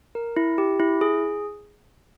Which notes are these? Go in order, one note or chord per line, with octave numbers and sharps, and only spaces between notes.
A#4
E4
G4
E4
G#4